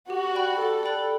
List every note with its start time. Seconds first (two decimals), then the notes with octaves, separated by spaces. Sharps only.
0.10 F#4 G4
0.34 D5 G5 B5 F#6
0.59 G4 A4
0.83 D5 G5 B5 F#6